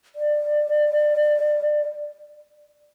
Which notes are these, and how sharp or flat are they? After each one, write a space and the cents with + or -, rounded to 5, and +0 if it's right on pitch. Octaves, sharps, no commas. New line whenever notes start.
D5 +15